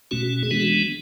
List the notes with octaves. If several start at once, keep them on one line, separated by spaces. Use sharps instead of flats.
B2 A3 C#4 F#4
G#4
E3 G#3 B3 D4 F#4